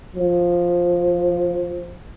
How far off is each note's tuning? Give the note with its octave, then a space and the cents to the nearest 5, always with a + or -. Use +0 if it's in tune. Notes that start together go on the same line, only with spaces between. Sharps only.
F3 +5